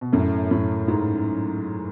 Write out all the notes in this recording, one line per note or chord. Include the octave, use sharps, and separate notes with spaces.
B2
F#2 A2
F#2 A2
G#2